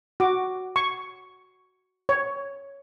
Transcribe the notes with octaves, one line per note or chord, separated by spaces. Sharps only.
F#4 D6
C#6
C#5